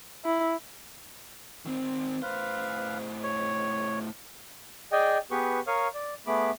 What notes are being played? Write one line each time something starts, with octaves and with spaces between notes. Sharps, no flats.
E4
D#3 C4
A2 B4 C5 F5
C#5
G#4 D5 D#5 G5 G#5
B3 G4 G#4 B4 C#6
A#4 C#5 F5 C#6 D#6 F6
D5
A3 B3 G#4 B5 D6